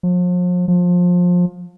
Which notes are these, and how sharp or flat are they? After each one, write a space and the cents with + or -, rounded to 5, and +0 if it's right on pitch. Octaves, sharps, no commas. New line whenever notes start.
F3 +40
F3 +25